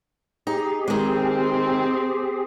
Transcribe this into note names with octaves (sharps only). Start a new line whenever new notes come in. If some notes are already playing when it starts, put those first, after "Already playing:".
D#4 G4 G#4
D#3 G#3 C4